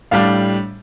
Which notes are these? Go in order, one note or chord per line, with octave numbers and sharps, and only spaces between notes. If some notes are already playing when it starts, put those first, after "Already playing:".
A2 G3 D4 F5